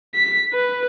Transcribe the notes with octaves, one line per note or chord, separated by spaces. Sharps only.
B6
B4